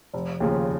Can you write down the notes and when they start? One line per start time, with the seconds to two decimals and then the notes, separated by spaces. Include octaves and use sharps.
0.13 F1
0.40 D#2 C#3 F3